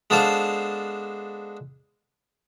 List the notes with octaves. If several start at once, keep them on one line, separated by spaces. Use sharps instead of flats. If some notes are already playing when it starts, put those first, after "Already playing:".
G#3 B3 D4 A4 C5 F5